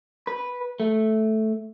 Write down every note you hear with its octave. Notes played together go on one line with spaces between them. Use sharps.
B4
A3